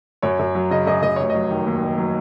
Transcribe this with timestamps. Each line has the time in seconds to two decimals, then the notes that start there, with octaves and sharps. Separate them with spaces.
0.22 F#2 C#5
0.39 F#2
0.55 F#3
0.71 C#3 D#5
0.87 F#2 D#5
1.02 F#2 D#5
1.16 F1 C#5
1.30 F#3 D#5
1.51 D#3
1.66 D#2
1.82 F1
1.98 F#3